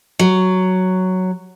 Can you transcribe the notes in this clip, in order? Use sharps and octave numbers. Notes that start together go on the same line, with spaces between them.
F#3